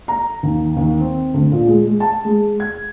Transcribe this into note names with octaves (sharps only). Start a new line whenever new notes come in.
A#5
D#2
D#2
C4
D2
A#2
G#3
G#3
A5
G#3
G#6